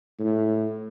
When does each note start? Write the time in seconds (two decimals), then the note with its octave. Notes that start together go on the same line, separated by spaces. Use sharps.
0.19 A2